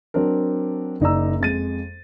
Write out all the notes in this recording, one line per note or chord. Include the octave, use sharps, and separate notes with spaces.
F#3 C4 D4 A#4
F#1 D#4 D5 A#5 E6
F2 G#3 A6 D#7